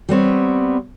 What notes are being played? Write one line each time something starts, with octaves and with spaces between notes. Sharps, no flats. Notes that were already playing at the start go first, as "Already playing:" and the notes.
G3 B3 C4 C#5